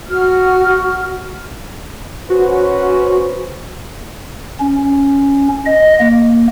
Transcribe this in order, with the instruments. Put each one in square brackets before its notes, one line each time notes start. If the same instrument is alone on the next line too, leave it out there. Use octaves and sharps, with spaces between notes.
[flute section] F#4 F6
[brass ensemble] C#4 B4 C5 [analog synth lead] F#4
[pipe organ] C#4
D#5
A#3